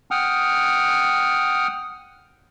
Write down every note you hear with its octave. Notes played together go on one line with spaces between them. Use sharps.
F#5 G5 D#6 F6